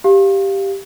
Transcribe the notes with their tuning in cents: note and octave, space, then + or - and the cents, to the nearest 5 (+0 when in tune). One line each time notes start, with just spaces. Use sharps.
G4 +0 F5 +0